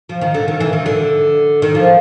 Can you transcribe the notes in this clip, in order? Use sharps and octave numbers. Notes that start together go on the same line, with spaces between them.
F3
D#3
D3
D#3
E3
D#3
D3
D#3
F3